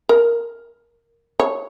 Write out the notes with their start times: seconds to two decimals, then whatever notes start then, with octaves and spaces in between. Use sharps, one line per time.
0.09 A#4
1.39 C#5